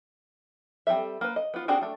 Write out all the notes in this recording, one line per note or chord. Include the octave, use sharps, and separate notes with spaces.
G3 C4 D#4 A4 E5
A#3 B4
D#5
B3 F4
C4 D4 F#4 G#4
A3 D4